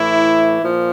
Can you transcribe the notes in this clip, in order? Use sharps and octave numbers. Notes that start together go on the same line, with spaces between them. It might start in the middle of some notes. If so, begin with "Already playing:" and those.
Already playing: A2 E3 E4
A#2 F3